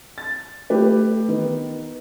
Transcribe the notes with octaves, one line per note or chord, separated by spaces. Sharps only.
A6
A3 G4 B4
D#3 B3